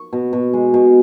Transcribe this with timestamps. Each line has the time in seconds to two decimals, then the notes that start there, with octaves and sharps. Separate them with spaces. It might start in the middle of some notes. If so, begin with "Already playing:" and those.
Already playing: C#6
0.13 B2
0.33 B2
0.53 G#3
0.74 B2